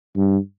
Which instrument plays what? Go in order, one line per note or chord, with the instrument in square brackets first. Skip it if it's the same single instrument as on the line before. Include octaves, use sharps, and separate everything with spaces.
[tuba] G2